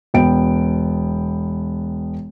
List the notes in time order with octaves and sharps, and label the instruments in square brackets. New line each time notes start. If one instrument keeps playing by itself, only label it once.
[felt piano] E1 B3 G5 D7